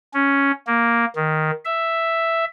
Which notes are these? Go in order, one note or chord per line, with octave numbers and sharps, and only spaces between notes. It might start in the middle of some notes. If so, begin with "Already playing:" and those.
C#4
A#3
D#3
E5